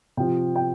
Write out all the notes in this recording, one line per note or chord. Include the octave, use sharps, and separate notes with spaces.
C3 F3 G5
G5